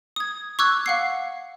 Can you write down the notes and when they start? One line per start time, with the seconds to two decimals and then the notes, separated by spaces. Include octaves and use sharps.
0.16 D#6 G#6
0.59 C#6 D6 E6 F#6 G#6
0.86 F5 F#5 C7